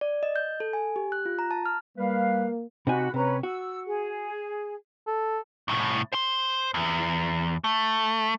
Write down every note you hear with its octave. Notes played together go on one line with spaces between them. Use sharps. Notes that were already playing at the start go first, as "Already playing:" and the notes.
D5
D#5
G6
A4
G#5
G4
F#6
F4
A#5
A5
F6
G3 A#3 B4 F5
C3 D#4 F#4 G#5 B5
C3 C#4 B4 A#5
F#4 E6
G#4
A4
C2 A2
C5 C6
E2
A3